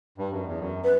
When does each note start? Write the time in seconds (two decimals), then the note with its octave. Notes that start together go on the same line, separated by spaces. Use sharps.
0.18 G2
0.31 F#2
0.46 E2
0.58 F#2
0.84 B4